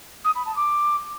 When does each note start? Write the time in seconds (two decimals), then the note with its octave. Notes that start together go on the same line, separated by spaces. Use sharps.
0.25 D#6
0.35 B5
0.46 A5
0.56 D6